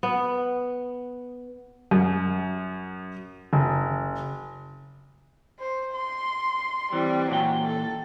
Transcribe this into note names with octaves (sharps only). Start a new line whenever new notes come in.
B3
F#2
F#1
C5
C6
E3 G3 C4
A#2 E3 F#3 G5
A4